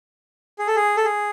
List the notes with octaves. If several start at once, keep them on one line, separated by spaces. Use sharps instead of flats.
G#4
A4
G#4
A4
G#4